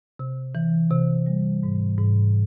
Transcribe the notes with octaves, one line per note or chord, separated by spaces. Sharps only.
C3
E3
C3
G3
G#2
G#2